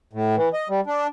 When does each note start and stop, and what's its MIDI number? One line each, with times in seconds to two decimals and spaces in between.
0.13 0.36 45
0.37 0.49 52
0.53 0.68 75
0.69 0.80 55
0.86 1.07 62